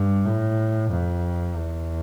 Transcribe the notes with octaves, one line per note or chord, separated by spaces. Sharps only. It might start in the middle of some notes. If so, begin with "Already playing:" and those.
Already playing: G2
A2
F2
E2